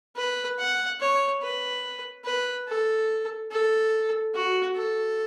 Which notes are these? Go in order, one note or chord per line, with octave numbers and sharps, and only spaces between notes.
B4
F#5
C#5
B4
B4
A4
A4
F#4
A4